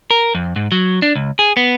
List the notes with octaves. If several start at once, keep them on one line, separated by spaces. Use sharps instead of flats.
A#4
F2
G#2
F#3
D4
C#2
G#4
B3